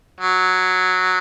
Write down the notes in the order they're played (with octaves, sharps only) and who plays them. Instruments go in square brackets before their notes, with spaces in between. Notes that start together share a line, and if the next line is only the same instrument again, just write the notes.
[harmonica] F#3